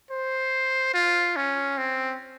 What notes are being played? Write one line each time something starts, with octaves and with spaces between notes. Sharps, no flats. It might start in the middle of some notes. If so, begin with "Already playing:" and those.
C5
F4
C#4
C4